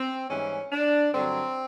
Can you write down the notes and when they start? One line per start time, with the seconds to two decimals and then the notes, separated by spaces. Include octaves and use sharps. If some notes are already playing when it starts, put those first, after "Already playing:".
Already playing: C4
0.30 G#2 E3 G3 C#4
0.72 D4
1.13 G2 D3 F#3 C4